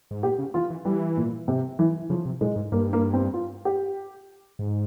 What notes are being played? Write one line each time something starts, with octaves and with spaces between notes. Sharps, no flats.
G#2
A#2 G4
C#3
E3 F4
E3
E3 G3
A#2
C3
E3
C#3 F3
C3
A#2 G#3
G#2
G2 A#3
A#3
C4
F4
G4
G#2